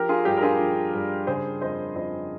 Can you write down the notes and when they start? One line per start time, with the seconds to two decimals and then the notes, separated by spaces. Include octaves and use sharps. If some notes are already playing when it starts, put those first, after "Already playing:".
Already playing: F3 G4 A#4
0.09 F4 G#4
0.25 G2 G4
0.37 A#4
0.42 F4 G#4
0.59 F3
0.94 G2
1.27 C#3 G#4 C5
1.61 F2 C5 D#5
1.95 F2 C5 D#5